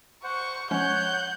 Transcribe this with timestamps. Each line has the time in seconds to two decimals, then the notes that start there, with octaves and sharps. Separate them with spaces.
0.24 C5 F#5 C#6
0.71 F3 G#3 C#4 C#5 F#5 F#6 G6